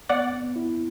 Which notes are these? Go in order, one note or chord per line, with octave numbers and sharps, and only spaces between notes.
B3 D5 F#5
B3
E4